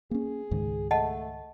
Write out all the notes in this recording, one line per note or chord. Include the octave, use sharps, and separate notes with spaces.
A#3 C#4 G#4
C#2 G#2 D#3
A3 D#5 F#5 A5